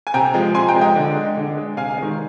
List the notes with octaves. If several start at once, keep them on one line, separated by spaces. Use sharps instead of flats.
G#5
C3 G5 A#5
F3 G#3
C3 G#5 C6
G5 A#5
F3 G#3
D#5 G5
D3
G#3
D3
G#3
C3 F5 G#5
D#3 G#3